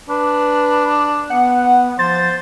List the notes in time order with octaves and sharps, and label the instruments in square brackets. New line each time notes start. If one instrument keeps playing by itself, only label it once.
[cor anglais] D4 [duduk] B4
[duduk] B3 [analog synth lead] F#5
[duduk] F3 [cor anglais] C5 [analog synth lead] A6